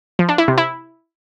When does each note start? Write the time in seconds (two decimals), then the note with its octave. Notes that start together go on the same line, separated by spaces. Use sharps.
0.19 F3
0.29 D4
0.38 E4
0.48 C3
0.58 E4